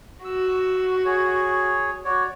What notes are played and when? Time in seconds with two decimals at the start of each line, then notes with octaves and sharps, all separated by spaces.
0.24 F#4 E6
1.05 G#4 C#5
2.04 F#4 C#5 D5